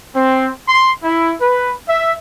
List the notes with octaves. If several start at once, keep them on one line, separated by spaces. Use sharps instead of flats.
C4
C6
E4
B4
E5